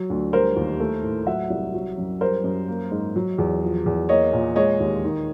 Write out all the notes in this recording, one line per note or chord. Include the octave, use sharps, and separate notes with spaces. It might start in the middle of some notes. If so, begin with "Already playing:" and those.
Already playing: F#3
D2
G3 A#4 C5
D#2
A3
A2
F#3 E5 F#5
C2
F#3
F#2
G3 A#4 C5
F#2
A#3
G#2
F#3
E2
F3
E2
A#3 C#5 D#5
A#2
G#3 C#5 D#5
D#2
D#3